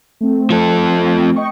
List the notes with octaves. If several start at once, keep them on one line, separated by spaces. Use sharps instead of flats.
A3 C4
F3 A4
D#5 G5 C#6